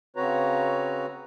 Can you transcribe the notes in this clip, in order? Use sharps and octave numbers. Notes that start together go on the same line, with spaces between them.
C#3 C4 F#4 B4 C#5 A#5